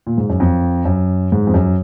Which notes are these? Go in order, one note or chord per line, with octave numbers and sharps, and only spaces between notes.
A#2
G#2
F#2
F2
F#2
G#2
F2
F#2